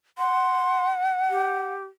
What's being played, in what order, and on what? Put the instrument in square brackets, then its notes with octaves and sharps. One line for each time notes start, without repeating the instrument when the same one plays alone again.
[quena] F#5 [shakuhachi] C6
[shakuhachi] G4